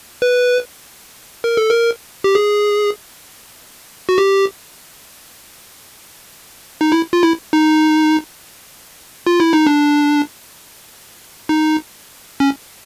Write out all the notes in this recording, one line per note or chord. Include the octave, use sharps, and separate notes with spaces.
B4
A#4
A4
A#4
G4
G#4
F#4
G4
D#4
E4
F4
E4
D#4
F4
E4
D#4
D4
D#4
C#4